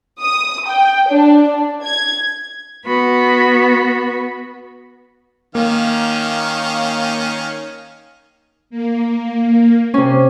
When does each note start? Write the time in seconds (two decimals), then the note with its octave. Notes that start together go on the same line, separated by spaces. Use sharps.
0.22 D#6
0.68 G5
1.10 D4
1.49 D4
1.83 G#6
2.85 B3 F#4 B5
5.55 D#3 A#3 C#4 F5
8.70 A#3
9.94 C3 C#4